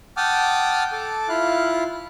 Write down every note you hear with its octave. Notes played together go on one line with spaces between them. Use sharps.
F#5 G5 A5 D6 D#6 F6
A4 A5 D6
E4 F4 F5 F#6